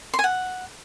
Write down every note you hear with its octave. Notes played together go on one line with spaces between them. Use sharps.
C6
G#5
F#5